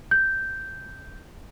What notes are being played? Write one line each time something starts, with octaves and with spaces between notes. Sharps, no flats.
G6